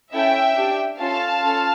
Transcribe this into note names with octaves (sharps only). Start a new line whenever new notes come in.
C#4 E4 A4 E5 G5
D4 G4
C#4 F4 A4 F5 A5
C#4 F4 A4